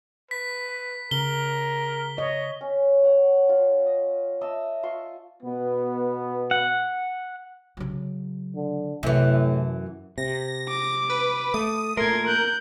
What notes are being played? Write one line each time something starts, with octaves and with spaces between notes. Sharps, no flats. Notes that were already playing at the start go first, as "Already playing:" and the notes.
B4 B6
C#3 A#4 G7
C#5 D#5
C#4
C#5 F#5
F4
D#5
D#5 E5 A5 E6
F4 C6 C#6
B2 B3
F#5
C#3 F#3
D3
F#2 A2 C3 E3
C3 A#6
D6
B4
A3 D#6
A#2 A3 A#4 C6 G#6
F#6 G6